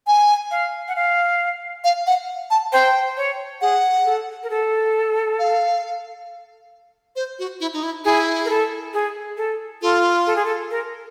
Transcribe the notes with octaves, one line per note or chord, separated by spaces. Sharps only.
G#5
F5
F#5
F5
F5
F#5
A5
C5 G5
C#5
G#4 F#5
A4
A#4
A4
F5
C5
F#4
E4
D#4
E4
E4 G#4
A#4
A4
G#4
A4
F4 A4
A4
G#4
A4
A#4